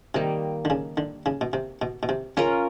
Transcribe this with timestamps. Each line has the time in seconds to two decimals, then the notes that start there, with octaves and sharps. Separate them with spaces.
0.15 C3 D#3 G3 A#3
0.65 D3
0.70 C#3
0.97 D3
1.26 C#3
1.41 B2
1.53 C3
1.82 B2
2.03 B2
2.09 C3
2.37 C#3 C#4 F4 A#4